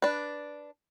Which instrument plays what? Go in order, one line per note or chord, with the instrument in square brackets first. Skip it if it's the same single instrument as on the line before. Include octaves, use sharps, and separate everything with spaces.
[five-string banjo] D4 B4